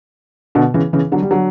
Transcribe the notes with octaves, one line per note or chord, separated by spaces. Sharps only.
B2 D3
C#3 E3
C#3 E3
D3 F#3
G3
D3 F#3